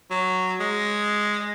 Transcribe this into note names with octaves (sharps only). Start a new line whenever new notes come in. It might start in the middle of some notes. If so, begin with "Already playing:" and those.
F#3
G#3